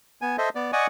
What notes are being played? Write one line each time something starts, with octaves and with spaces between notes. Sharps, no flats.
B3 G#5
A4 C5 D#5 E5
B3 D5
D5 D#5 F#5 G#5 C#6 D#6